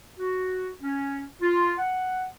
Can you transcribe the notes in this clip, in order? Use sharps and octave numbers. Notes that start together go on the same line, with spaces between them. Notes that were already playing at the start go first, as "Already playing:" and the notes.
F#4
C#4
F4
F#5